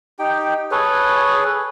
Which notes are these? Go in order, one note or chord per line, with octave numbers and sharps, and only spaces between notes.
D#4 G4 G5
G#4 A4 B4 C#5